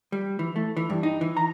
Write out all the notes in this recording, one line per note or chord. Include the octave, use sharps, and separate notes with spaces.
G3
E3
A3
E3
G2
D#4
E3
A#5